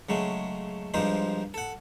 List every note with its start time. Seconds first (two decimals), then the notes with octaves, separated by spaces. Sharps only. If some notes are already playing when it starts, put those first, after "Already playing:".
0.09 C#3 F#3 G#3 A3
0.94 G2 F3 G3 G#3 C4 D#4
1.54 A4 F#5